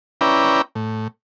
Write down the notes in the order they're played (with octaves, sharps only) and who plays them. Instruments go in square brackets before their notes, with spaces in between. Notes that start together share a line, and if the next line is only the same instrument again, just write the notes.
[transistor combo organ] C#4 E4 B4 D5 G5 A#5
A2